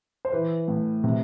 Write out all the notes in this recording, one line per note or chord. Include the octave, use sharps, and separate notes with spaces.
C5
E3 B4
A2
C3